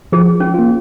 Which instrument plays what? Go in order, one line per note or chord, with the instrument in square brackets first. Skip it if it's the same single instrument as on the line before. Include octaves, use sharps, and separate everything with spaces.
[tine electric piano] F3 [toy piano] G#4
[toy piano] C#4
[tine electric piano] A#3 F4